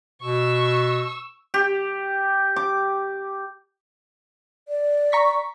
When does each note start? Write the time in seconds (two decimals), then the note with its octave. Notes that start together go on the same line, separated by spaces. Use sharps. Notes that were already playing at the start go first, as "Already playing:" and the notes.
0.22 B2 C#6 E6
1.54 G4
2.56 D6
4.68 D5
5.12 A#5 C#6 B6